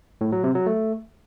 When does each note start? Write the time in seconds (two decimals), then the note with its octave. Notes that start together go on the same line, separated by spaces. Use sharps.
0.21 A2
0.32 F#3
0.44 C3
0.55 F#3
0.66 A3